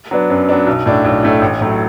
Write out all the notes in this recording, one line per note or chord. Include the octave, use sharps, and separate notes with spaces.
F#3 B3 D4
F#2
F#3 B3 D4
B1
A2 A3 D4
B1
A2 A3 D4
A1
A2 F#3 A3